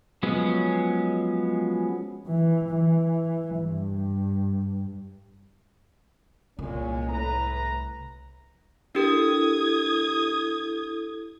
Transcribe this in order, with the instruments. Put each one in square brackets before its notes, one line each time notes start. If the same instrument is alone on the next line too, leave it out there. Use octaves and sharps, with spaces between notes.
[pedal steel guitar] F3 F#3 G#3 B3 C#4
[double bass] E3
E3
G2
[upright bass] C2 [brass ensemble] A#2 G#3 C#4
[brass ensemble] A2 B4 A#5
[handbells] D4 G4 A#4 [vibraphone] E4 A4 [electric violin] D#6 G#6